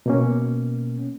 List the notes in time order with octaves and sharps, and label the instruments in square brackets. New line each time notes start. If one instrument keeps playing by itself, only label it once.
[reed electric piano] B2 A#3 C#4